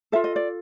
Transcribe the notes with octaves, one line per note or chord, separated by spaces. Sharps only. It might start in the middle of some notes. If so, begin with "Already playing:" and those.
F4 A4 E5
D#5
D5